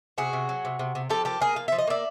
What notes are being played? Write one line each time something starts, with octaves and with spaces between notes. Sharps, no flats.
C3 F#4 G#4
C3
F#3
C3
C3
C3
F3 G4 A4
A#3 G4 A4
A#3 G#4 A#4
F3 F5
F3 E5
D#5
A#3 D5 E5